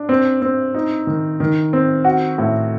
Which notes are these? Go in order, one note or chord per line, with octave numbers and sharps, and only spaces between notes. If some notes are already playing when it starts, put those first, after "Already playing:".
Already playing: D4
C4
C4
D#4
D#3
D#3
C4
F#4
A2